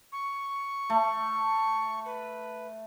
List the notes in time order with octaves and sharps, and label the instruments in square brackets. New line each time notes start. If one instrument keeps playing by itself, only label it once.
[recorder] C#6
[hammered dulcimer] A3
[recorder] B4